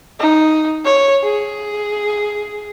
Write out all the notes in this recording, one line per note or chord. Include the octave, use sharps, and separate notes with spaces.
D#4
C#5
G#4